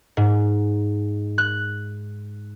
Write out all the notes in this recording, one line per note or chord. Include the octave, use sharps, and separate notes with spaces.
G#2
F#6